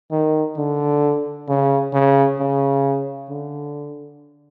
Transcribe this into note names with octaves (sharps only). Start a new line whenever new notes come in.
D#3
D3
C#3
C#3
C#3
D3